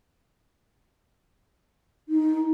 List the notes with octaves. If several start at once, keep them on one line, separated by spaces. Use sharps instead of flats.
D#4